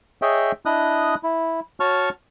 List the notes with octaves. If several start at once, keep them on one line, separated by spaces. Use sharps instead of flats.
G#4 C#5 D#5 E5 G5
D4 E4 D#5 D#6 F#6
E4
F#4 C#5 A5 C#6 F6